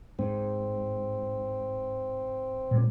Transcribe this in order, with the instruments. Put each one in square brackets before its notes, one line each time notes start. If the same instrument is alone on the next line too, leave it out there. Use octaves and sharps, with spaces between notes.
[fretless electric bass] G#2 [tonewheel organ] C4
[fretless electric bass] A#2 G#3